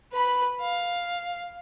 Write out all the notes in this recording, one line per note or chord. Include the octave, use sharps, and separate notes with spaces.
B4 B5
F5